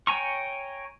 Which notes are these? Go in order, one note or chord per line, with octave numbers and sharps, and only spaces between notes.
C#5 G5 G#5 A#5 C#6